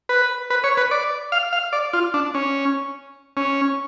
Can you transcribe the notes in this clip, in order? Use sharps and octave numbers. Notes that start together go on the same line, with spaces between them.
B4
B4
C#5
B4
D5
F5
F5
D5
F4
D4
C#4
C#4